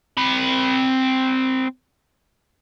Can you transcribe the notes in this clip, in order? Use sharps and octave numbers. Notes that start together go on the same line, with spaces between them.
C4 B5